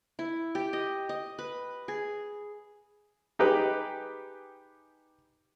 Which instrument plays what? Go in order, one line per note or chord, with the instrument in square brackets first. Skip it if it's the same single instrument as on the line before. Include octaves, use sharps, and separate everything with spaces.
[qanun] E4
G4
D#5
D#5
B4
G#4
[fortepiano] D#4 G4 G#4 B4 G5